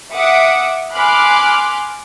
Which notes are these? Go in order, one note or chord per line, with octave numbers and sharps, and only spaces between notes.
E5 F#5 D6 D#6 C#7
G#5 B5 C6 D6 F6 F#6